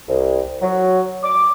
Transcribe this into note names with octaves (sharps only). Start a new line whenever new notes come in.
C2
F#3
D6